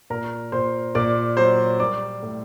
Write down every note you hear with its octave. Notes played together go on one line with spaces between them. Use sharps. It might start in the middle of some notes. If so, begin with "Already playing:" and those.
A#2 A#4 A#5
A#2 C5 C6
A#2 D5 D6
F#3 C5 C6
G3 D5 D6
A2